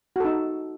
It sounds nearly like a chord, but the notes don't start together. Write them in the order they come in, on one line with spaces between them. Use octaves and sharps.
F#4 A4 D#4